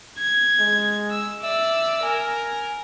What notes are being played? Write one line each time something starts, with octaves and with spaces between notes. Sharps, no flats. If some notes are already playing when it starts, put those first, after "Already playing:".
G#6
G#3
E6
D5 E5 E6
A#4 G#5